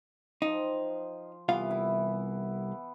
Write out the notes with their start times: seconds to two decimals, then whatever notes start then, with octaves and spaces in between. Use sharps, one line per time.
0.42 F3 D#4 G5
1.49 C2 E3 B3 F4 F5
1.71 E4